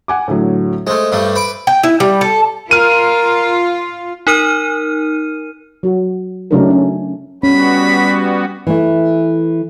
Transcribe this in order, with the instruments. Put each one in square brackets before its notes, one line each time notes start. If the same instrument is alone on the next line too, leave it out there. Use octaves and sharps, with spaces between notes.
[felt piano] F#5 G#5 D6
A2 D3 F#3
[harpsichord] G#3 A3 [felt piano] C5
[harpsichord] G2 G3 A3
B4 D6
[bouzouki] G5
E4
G3
A4
[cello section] F4 [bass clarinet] A#4 [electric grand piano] F6 D#7
[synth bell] D#4 A#4 F6 D#7
[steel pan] F#3 F#4
C#3 F#3 A3 D4 D#4 A#4
C#4
[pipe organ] G3 B3 F#4 [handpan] C#4 [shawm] B5
[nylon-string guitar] E3 A3 E4